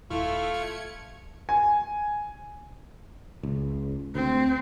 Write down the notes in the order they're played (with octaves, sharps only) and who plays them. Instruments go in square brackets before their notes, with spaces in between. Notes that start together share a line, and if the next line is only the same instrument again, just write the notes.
[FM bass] D#1 [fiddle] A3 [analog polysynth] E4 [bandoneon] F4 C#6 F6
[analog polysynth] G#6 C#7
[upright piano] G#5
[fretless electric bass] C#2
[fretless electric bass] D2 [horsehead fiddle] C4